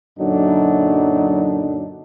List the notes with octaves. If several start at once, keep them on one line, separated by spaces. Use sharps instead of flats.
F#2 A#2 D3 F#3 D4 D#4